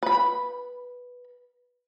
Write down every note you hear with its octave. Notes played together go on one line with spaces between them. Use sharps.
B4 B5